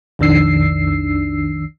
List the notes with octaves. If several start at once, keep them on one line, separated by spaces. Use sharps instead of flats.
B1 F2 D#3 D4 E6 C7